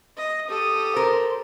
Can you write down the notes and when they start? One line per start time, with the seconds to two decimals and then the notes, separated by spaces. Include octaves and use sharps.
0.17 D#5
0.48 G4 A4 D#6
0.96 A#4 C5